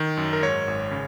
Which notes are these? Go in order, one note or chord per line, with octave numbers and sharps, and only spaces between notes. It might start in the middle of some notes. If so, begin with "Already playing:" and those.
Already playing: D#3
F#2
A#4
G#2 C#5
G#1
C#3